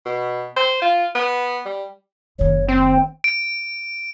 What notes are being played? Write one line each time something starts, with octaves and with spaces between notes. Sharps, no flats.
B2
C5
F4
B3
G3
F#1 D#3 C#5
C4 G5
D7